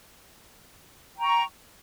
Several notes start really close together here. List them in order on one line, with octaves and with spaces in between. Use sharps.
G5 A#5 C#6